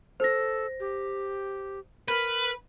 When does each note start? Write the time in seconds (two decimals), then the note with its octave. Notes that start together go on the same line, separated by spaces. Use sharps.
0.20 A4 C5 A#6
0.80 G4
2.08 A#4 B4